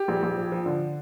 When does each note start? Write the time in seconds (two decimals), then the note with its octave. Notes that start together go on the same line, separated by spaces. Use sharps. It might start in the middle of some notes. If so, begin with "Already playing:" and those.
Already playing: G4
0.08 A#1
0.23 A#1
0.37 F3
0.52 F3
0.66 D3